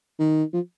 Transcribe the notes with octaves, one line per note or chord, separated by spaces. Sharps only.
D#3
F3